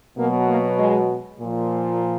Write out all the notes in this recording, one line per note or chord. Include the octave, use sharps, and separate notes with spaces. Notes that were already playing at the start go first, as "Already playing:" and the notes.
B2 F#3 A#3
A#3
G#3
A#2 F3